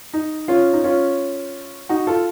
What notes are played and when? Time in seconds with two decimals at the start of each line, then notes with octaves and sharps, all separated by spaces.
0.13 D#4
0.48 C#4 F4
0.73 D#4
0.84 C#4 F4
1.89 D#4 F#4
2.07 F4 A4